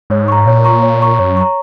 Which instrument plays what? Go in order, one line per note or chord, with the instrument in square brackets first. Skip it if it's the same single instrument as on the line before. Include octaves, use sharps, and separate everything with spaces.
[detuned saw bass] G#2 [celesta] C#5
[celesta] A#5 C#6
[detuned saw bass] A#2 [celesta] C#5
[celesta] A#5 C#6
C#5
A#5 C#6
[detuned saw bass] F#2 [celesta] C#5
[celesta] A#5 C#6